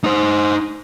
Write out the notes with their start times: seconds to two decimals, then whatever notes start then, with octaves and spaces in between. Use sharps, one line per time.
0.04 D#4 C5